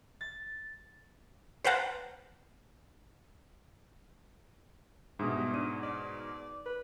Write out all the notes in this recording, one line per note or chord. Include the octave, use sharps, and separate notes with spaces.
A6
B4 C5 F5 F#5 A5 A#5
G#2 B2 D4 E5 D#6
G3
D4 D#4 D#7
D5
B4